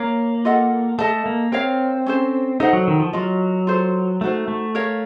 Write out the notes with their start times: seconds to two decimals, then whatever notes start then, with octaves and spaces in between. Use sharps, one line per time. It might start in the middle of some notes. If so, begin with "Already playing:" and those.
Already playing: A#3 A#4 C#5 F5 A#5
0.45 F4 A4 D#5 F#5
0.99 A3 A4 D#5 A5
1.26 A#3
1.52 C4 A#4 C#5 F5
2.06 C#4 A4 C5
2.60 D#4 A4 C5 F#5
2.73 F#3
2.88 D#3
3.00 F3
3.13 F#3 F4 A#4 D#5
3.67 F4 A4 C5
4.21 A3 D#4 F#4 C5
4.48 A3
4.75 A#4 C#5 F5